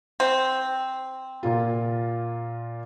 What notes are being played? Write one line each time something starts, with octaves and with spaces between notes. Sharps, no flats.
C4
A#2 A#3 F4